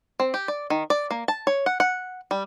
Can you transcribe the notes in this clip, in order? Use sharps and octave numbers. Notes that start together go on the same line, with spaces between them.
C4
G4
D5
D#3
D5
A#3
A5
C#5
F#5
F#5
G3